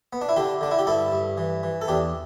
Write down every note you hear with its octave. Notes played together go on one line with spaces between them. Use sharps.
B3
D4
E4
D3 D4 G4
D3 D4
E4
G4
G2 E4 A4
G2
E3
E3
A4
E2 D4 G4